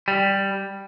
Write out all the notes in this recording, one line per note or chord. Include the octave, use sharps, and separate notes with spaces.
G3